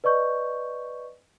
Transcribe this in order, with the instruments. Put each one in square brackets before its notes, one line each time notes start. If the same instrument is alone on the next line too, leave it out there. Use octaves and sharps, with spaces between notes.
[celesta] B4 D5 D#5 C#6 G6